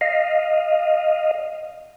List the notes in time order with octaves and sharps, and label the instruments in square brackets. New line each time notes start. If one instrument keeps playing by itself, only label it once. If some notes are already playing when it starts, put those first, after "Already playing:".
[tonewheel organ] D#5 F5